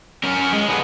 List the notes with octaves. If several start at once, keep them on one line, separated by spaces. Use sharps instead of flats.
C#4 A#4
G#3
D3 B3